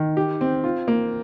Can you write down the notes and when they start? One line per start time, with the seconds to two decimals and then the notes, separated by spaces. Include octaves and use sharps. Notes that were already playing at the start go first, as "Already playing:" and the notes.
Already playing: D#3
0.17 G4
0.41 C4
0.64 F4
0.88 A#3